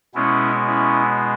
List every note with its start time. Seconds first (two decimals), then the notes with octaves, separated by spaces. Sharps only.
0.15 B2 G#3 B3 C#4 E4
0.67 C#4 E4